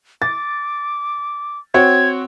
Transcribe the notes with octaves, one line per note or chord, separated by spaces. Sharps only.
D6 A6
C4 F#4 C#5 G#6